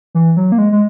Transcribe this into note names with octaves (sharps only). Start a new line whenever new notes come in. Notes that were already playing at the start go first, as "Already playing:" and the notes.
E3
F#3
A#3
G#3
G#3